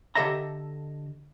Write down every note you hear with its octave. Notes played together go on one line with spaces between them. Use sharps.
D3 G4 A4 D#5 E5 A#5